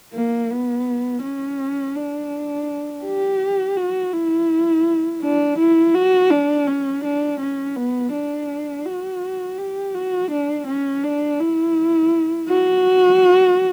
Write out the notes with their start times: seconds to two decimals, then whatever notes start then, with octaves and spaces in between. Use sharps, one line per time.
0.14 A#3
0.51 B3
1.23 C#4
1.96 D4
3.05 G4
3.77 F#4
4.13 E4
5.22 D4
5.59 E4
5.95 F#4
6.31 D4
6.67 C#4
7.04 D4
7.40 C#4
7.76 B3
8.13 D4
8.85 F#4
9.58 G4
9.95 F#4
10.31 D4
10.68 C#4
11.04 D4
11.40 E4
12.48 F#4